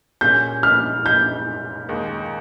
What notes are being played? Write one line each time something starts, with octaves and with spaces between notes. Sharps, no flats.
A#2 G3 C#4 G#4 G6
F6
G6
D#2 D#3 G#3